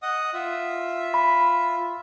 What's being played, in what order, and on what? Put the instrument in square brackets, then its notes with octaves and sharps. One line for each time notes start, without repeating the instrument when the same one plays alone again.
[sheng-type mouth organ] D#5 F#5 D#6
F4 E5
[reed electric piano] B5